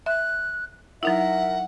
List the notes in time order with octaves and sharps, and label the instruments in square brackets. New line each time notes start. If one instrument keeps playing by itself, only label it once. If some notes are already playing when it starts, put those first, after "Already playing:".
[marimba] E5 [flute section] F#6
[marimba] F#3 D#4 E4 [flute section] A#4 E5 [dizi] F#5